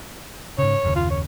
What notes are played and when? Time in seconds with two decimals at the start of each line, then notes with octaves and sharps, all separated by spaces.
0.58 G#2 C#3 C#5
0.83 F#1 D#2 C#3
0.96 F4
1.10 C#5